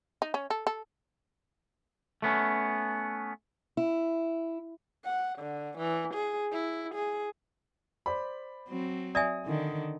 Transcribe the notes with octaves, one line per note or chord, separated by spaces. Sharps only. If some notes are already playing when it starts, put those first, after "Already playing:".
D#4
C#4
A4
A4
A3 B3 C#4
E4
F#5
D3
E3
G#4
E4
G#4
C5 D5 B5
F#3 C4
D5 E5 G#5 D#6
D3 D#3